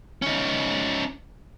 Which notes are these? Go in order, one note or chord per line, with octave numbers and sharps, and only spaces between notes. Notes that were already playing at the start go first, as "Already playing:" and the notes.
C#4 D#4